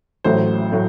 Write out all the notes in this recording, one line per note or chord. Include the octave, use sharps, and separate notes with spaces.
A1 A2 F#3 A3 C5
A2 F#3 A3